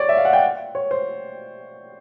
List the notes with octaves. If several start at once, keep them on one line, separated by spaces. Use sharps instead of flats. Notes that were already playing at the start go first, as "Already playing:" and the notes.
Already playing: C#5 D5
E5
F5
F#5
G5
C#5
C5